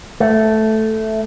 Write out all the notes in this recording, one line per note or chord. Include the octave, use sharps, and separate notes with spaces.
A3